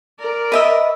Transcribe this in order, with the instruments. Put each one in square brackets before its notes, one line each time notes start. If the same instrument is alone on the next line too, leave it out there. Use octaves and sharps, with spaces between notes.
[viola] A#4 D5
[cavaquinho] B4 D#5 E5